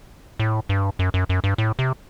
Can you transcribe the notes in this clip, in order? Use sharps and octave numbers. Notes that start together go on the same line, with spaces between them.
A2
G2
F#2
F#2
F#2
G2
A2
C3